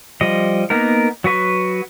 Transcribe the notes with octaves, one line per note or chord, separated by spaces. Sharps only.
F3 G3 D#5
A#3 B3 D#4 A#4
F#3 F#4 B4 C#6